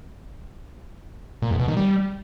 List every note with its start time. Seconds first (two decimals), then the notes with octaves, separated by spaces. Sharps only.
1.42 A#2
1.51 E2
1.59 B2
1.68 D#3
1.77 G3